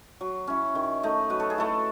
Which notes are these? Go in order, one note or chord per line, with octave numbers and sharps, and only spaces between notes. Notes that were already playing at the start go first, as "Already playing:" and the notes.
F#3
C#4 E4
D#3
A3 D#4
F#3 B4
A4
G#4
A3 E4 A4